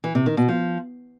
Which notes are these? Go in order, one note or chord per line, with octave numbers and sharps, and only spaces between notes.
E3
C3
D#3
B2
F3